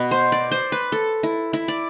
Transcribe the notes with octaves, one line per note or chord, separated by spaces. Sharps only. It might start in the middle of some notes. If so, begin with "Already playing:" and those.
Already playing: B2 B3
C5
D5
C5
B4
A4
E4
E4
D5